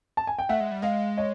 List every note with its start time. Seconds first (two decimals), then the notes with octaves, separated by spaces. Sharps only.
0.17 A5
0.27 G#5
0.39 G5
0.49 A3 E5 F#5
0.60 G#3
0.71 G3
0.82 G#3 D#5 F5
1.17 C#5 D#5